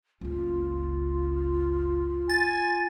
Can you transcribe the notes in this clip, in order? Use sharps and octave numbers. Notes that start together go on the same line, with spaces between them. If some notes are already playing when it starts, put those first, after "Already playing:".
F#1 C#2 F4
G#5 A6